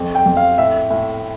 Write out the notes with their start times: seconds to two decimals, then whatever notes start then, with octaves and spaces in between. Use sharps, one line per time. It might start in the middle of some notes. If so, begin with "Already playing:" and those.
Already playing: F2
0.15 G5
0.26 F2
0.37 F5
0.58 A2 E5
0.90 A2